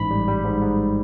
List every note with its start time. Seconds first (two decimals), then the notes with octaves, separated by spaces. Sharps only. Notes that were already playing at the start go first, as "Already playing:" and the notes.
Already playing: A1 G#2 B5
0.11 G3
0.28 G3
0.45 G#2
0.62 G#2